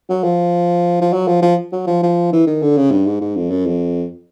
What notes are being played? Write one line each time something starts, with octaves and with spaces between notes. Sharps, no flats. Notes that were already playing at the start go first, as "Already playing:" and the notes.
F#3
F3
F3
F#3
F3
F3
F#3
F3
F3
E3
D#3
D3
C#3
G2
G#2
G#2
F2
F#2
F2